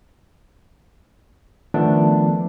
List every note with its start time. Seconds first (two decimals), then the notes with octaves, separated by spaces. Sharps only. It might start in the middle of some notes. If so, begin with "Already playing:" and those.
1.74 D#3 F3 A3 B3 D4